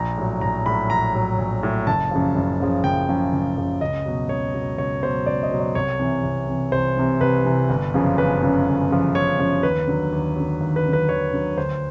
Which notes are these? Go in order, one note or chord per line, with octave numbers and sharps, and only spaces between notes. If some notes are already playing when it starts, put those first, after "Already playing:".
Already playing: A#1 A#5
A2 F#3
A#1 A#5
A2 F#3 B5
A#1 A#5
A2 F#3
A#1
A2 F#3
F#1 A5
F#2 C#3 F3
F#1
F#2 C#3 F3
F#1 G5
F#2 C#3 F3
F#1
F#2 C#3 F3
C#2 D#5
B2 F#3
C#2 C#5
B2 F#3
C#2 C#5
B2 F#3 C5
C#2 D5
D#5
B2 F#3
D5
C2 C#5
C3 E3
C2
C3 E3
C2 C5
C3 E3
C2 B4
C3 E3
G1
F#2 C#3 F3
G1 B4
F#2 C#3 F3
G1
F#2 C#3 F3
G1 C#5
F#2 C#3 F3
D#2 B4
D3 F#3
D#2
D3 F#3
D#2
B4
D3 F#3
B4
D#2 C#5
D3 F#3
D2 C5